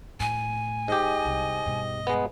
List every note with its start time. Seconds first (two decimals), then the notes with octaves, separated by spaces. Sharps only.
0.20 A2 G#5
0.88 G#2 G4 D#5
1.25 C2
1.66 G2 B2
2.07 G#3 B3